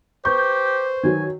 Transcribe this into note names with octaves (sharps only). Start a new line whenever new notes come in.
G4 B4 C5 C#6 G6
D#3 F#3 G#5